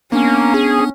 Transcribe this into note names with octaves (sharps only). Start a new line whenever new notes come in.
A#3 B3 C#4 D4
G#4